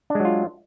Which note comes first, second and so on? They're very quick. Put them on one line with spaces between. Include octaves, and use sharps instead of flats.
D4 G#3 F#3 F4